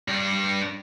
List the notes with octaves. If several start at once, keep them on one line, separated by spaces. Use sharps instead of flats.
G2 D4